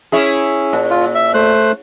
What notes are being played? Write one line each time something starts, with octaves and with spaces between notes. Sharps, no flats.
C#4 E4 G#4
A#2
F4
E5
A3 C5 F#6